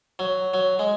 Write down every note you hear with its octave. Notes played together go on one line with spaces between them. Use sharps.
F#3
F#3
G#3